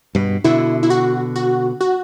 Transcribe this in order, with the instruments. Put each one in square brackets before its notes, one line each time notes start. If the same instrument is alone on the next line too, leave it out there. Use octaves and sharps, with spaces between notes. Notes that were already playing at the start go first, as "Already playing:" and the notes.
[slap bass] G2 B2
[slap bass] B2 D3 [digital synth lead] E4
[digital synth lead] E4
F#4
F#4
F#4